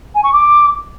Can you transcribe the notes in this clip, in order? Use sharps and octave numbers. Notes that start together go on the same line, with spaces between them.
G#5
C#6
D6